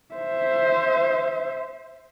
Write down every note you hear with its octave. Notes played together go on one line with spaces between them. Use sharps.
C5 E5